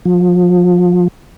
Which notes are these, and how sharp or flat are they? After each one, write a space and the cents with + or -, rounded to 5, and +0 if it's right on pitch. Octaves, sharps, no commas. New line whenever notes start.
F3 +30